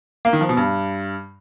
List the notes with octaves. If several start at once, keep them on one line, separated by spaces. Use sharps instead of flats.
A#3
D#3
F3
B2
G2